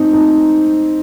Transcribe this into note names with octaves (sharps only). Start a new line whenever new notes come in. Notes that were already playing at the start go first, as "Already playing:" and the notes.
Already playing: C4 D#4
D#4